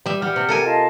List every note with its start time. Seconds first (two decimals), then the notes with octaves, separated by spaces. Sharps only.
0.06 G3 E5
0.22 G3 G4 F#5 F6
0.36 C3
0.49 A4 A#4 G#5
0.65 F4 D#5 A5